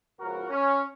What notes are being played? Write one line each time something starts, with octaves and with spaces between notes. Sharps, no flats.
C#2 C#3 F3 B3 F#4 A#4
C#4